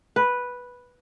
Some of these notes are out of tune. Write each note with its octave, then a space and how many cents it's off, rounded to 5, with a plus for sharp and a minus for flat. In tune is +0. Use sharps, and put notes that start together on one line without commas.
B4 -5